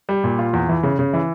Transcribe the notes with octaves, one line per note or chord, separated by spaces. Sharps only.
G3
A#2
F4
E2
E3
C#3
C#3
E3